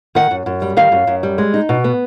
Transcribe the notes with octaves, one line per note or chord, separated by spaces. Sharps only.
D#3 F#5
F#2
F#2
G3
D#3 F5
F#2
F#2
G3
G#3
D#4
B2
B3